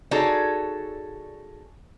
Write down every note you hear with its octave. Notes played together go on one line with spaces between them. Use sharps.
D#4 F#4 G#4 A4 C#5 D5